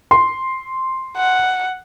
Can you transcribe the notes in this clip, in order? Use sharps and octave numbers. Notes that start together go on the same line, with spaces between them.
C6
F#5